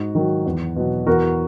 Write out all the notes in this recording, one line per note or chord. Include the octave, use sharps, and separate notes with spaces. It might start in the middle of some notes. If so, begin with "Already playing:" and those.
Already playing: G#2 F#4
D#3 F#3
E2
B2 F#3
E2 F#4 A#4